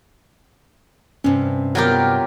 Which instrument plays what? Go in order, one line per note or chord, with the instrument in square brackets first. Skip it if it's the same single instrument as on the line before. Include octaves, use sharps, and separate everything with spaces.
[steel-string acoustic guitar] G2 C3 [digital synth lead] C#4
[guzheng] F#3 F4 G4 [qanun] B3 A#4 [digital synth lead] G5